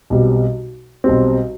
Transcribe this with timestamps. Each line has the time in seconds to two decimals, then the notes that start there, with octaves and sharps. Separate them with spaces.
0.10 B1 B2 G3 C4
1.04 B1 B2 G3 C4